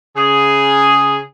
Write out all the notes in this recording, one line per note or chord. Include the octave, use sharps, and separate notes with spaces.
C#3 G#4